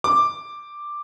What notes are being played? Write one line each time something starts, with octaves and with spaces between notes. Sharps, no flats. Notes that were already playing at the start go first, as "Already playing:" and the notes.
D6